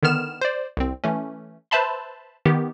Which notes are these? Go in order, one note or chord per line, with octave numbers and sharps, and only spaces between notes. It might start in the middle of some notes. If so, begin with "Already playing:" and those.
D3 D#3 B3 F6 E7
C5 D5
C2 C4
E3 A3 C#4
B4 C5 E5 A5 B5 C6
D#3 B3 G4